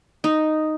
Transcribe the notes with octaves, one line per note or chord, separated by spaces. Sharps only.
D#4